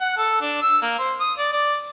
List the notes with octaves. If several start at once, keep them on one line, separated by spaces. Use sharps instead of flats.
F#5
A4
D4
E6
A#3
C5
D#6
D5
D5